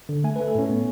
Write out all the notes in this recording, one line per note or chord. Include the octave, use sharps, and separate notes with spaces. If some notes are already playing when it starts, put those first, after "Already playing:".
D3
A3 G#5
A3 B4
A4
A2 C#4
B3